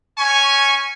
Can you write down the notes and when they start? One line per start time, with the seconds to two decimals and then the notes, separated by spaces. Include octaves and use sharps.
0.17 C#4 G#5 C#6